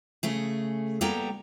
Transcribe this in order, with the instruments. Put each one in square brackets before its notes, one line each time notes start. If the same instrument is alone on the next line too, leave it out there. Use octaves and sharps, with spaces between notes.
[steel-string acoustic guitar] C#3 A3 G#4
G3 A#3 B3 A4 G5 A#5